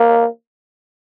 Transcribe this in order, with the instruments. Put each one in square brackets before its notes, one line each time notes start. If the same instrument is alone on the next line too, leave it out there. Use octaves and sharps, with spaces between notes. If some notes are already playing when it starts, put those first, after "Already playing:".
Already playing: [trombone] A#3